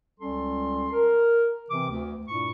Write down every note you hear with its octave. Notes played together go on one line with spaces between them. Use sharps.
C#2 G3 C#4 A4 C6
A#4
C3 E3 C4 D6
D2
G2 A#2 E4 C#6